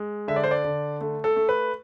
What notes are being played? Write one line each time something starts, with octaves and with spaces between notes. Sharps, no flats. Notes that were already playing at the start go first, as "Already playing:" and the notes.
Already playing: G#3
D3 E5
D5
C5
D5
D3
A3
A4
A3
B4